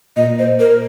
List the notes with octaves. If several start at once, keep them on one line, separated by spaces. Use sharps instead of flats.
A#2 D#5
C5
A#4